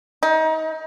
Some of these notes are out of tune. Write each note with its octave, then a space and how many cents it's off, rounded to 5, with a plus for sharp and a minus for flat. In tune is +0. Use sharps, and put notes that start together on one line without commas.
D#4 +30